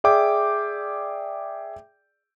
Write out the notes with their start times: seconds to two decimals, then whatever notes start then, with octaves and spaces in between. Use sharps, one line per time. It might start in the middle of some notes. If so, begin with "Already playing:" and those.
0.04 G#4 D5 E5 G5 D6 G6